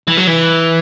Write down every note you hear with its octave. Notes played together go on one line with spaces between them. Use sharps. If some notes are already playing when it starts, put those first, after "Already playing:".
E3
F#3
E3